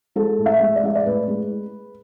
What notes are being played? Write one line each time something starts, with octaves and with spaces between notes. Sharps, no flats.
G#3 A4
A2
E5
G#3
D5
G#3 E5
D5
A2 B4
G#3